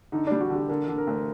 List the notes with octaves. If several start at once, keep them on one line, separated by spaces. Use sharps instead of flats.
D3 D#4
G3 D4
F#4
D3 G4
D3 A#4
D3
A#4
D2